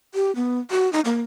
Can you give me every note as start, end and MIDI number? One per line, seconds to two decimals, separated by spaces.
0.14 0.34 67
0.35 0.59 59
0.71 0.91 66
0.93 1.00 63
1.05 1.22 58